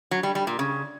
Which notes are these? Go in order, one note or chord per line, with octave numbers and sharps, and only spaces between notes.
F#3
G3
G3
A#2
C#3